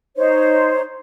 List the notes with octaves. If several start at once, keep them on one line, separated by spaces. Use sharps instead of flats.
D#4 C5 C#5